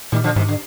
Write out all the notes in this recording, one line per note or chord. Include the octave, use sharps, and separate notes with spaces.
A#2 D#3 G3
D3 F3
G#2 C3 D#3
D3